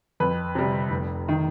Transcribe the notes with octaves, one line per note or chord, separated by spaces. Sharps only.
F2 B4
C3 G3
F1
D#3